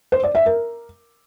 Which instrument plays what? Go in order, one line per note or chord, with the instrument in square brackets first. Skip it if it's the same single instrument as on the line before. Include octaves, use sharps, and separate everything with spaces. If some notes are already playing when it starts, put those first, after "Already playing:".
[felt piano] C5
D5
E5
A#4